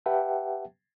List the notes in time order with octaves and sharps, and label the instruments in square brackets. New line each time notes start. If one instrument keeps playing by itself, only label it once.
[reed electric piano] G4 B4 E5 F#5 G5 A5